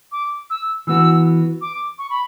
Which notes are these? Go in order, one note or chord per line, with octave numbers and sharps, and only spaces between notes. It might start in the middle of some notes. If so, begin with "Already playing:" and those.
D6
E6
E3 B3 F#4 E6
D6
C#6
B5